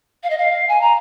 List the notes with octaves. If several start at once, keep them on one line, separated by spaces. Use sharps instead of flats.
F5
D#5
F5
G#5
A#5